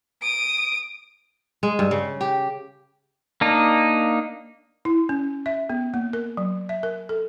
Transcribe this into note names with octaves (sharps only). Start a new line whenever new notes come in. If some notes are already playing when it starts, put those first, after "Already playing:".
D#6 D7
G#3
G2
C#3
G4
A#3 D4 D#4
E4
C#4
E5
B3
A#3
A#4
F#3
E5
A#4
A4